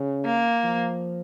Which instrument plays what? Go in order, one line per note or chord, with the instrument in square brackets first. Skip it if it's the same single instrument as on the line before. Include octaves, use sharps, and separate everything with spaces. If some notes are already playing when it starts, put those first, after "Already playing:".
Already playing: [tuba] C#3
[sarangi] A#3
[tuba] F3